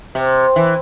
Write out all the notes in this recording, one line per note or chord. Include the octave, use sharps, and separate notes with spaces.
C3
E3